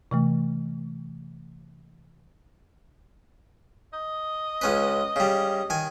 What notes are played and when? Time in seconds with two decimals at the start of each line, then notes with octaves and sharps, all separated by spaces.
0.11 C3 E3 A3
3.93 D#5
4.61 C#2 C#4 B4
5.16 C#3 G3
5.70 D#3 G#5